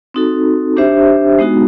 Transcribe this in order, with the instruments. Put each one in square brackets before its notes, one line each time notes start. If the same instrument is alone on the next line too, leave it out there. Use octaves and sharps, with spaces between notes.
[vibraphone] C4 D#4 F#4 A4
D4 G4 C5 E5
G#3 B3 D#4 F#4